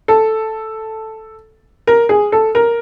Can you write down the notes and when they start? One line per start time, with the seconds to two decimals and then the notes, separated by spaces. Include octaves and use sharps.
0.08 A4
1.87 A#4
2.09 G#4
2.32 A4
2.55 A#4